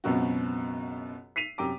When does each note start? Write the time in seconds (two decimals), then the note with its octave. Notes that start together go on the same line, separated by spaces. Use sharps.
0.04 C#2 F#2 B2 B3 C4 F#4
1.36 B6 C7 D#7 F7
1.58 F#2 C3 G5 A#5 D6